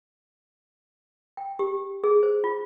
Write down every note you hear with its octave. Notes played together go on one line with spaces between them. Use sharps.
G5
G4
G#4
C5
F4